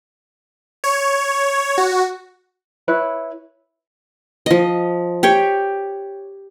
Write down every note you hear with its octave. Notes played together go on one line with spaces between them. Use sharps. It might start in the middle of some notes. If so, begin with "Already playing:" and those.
C#5
F#4
E4 B4 C#5
F3 D#5
G4 C#5 G5